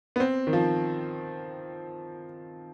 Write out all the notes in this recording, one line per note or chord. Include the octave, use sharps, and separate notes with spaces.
B3
C4
D#3
F3